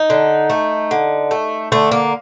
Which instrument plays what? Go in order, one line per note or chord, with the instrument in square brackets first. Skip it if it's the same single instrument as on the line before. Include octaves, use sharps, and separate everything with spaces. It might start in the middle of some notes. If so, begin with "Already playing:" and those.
Already playing: [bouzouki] D#4
D3
A3
D3
A3
D3 A3
A#3